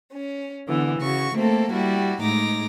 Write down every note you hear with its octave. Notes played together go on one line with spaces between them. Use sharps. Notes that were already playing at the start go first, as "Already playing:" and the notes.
C#4
D3 E3 B3
C#3 F#4 C#6
A3 A#3 C4 A4
G3 E4 F#4
A2 G#3 D#4 D6 A#6